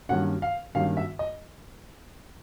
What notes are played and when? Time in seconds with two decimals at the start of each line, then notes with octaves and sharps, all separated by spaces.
0.09 G2 D#3 F#3 A#3 C#4 F#5
0.42 F5
0.75 G2 D#3 F#3 A#3 C#4 F5
0.97 E5
1.19 D#5